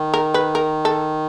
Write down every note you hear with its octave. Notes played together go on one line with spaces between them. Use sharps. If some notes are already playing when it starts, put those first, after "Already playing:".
Already playing: D#3
A#4
B4
A#4
A4